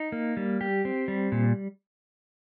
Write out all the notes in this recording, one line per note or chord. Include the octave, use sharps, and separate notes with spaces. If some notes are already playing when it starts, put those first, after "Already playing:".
Already playing: D#4
A#3
G3
G4
C4
G3
A#2